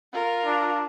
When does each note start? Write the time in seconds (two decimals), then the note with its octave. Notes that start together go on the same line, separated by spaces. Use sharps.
0.13 F4 A#4
0.46 D4